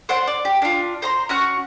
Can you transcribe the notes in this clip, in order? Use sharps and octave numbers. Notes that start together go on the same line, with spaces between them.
C5 D5 F#5 C6
D5
G4
D4 F4
C5 A#5 C6
C#4 F#4 C#6 F#6